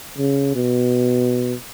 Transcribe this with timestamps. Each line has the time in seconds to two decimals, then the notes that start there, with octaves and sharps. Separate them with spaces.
0.18 C#3
0.55 B2